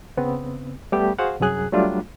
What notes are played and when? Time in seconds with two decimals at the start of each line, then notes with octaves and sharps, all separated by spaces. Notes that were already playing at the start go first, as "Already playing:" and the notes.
0.17 C#3 B3 C4
0.92 G3 A3 B3 G4
1.19 F#4 G#4 C5 F5 F#5
1.40 C2 F#2 F#3 G#4 F#6
1.72 F#3 G3 A3 D4 F4